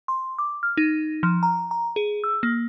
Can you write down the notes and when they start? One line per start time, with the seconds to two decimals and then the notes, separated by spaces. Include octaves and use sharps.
0.08 C6
0.39 D6
0.63 F6
0.77 D#4
1.23 F3
1.43 A#5
1.71 A#5
1.96 G#4
2.24 E6
2.43 A#3